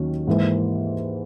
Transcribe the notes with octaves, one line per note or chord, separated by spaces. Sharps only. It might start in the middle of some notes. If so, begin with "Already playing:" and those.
Already playing: D#2 D#3 F#3 C#4
G#2 E3 A#3